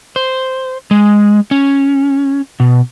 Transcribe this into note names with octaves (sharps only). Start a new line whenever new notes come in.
C5
G#3
C#4
B2